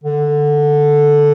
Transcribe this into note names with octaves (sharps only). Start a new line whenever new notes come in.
D3